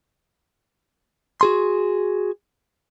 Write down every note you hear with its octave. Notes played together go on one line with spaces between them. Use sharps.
F#4 G#4 C6